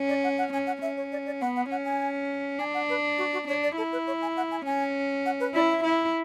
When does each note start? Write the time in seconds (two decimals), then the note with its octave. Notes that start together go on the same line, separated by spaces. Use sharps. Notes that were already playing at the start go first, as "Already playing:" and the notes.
Already playing: C#4
0.09 D5
0.24 F#5
0.38 F#5
0.53 C#4 G#5
0.67 F#5
0.82 C#4 E5
0.97 C#5
1.12 D5
1.26 D5
1.41 B3 F#5
1.56 F#5
1.70 C#4 F#5
1.85 G#5
2.59 D4 G#5
2.74 F#5
2.89 B4
3.18 F#4
3.33 F#4
3.48 D4 C#5
3.63 D5
3.77 E4 A4
3.92 B4
4.07 C#5
4.22 G#5
4.37 F#5
4.51 G#5
4.66 C#4 G#5
5.26 F#5
5.40 B4
5.54 E4 D5
5.70 E5
5.84 E4